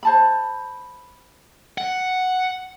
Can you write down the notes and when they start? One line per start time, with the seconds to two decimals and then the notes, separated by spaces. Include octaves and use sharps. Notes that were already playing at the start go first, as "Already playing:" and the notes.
0.03 C5 A5 B5
1.78 F#5